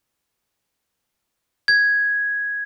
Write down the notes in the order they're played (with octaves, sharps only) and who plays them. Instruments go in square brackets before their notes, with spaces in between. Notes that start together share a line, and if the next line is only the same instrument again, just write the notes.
[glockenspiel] G#6